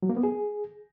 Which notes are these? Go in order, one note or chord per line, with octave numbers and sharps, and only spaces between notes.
F#3
A#3
B3
G#4